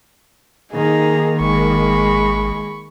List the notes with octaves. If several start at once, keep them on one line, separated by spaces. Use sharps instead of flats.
D#3 A#3 D#4 G#4 A#5
G#1 G#3 B5 C#6